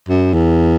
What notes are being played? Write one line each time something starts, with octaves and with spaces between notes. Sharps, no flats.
F#2
E2